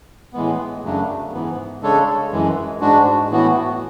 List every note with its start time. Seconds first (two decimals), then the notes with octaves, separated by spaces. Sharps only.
0.33 A2 E3 G#3 B3
0.83 F#2 C#3 F#3 A3 D4
1.32 G#2 E3 B3
1.82 C#3 G#3 D4 A4 C#5
2.31 F#2 E3 G#3
2.80 G#2 G#3 D4 F#4
3.30 A2 E3 B3 F#4